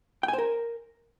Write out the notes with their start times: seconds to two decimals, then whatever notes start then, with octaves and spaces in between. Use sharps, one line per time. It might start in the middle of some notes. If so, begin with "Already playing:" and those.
0.23 G5
0.28 G#5
0.33 C5
0.38 A#4